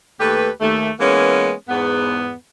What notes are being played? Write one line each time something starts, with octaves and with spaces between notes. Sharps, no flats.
D#2 A3 G4 B4
D#2 A3
E3 G#3 A#3 B3 C#4
E2 G#2 B3